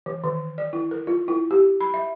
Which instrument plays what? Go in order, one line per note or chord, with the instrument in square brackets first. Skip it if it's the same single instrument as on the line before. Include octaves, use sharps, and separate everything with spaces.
[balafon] E3
D#3
D5
E4
A#4
F4
E4
G4
B5
E5